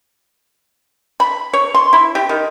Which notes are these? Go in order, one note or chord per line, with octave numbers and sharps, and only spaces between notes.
B5
C#5
C6
E4
G4
D#3